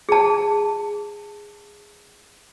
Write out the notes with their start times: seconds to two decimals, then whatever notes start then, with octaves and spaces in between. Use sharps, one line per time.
0.09 G#4 A5